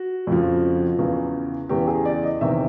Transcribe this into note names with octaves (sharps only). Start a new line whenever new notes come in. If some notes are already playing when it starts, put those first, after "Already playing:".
Already playing: F#4
F2 C#3 F3
E2 C#3 E3
E2 C#3 E3 G4
G#4
D5
D#5
E2 C3 D#3 E5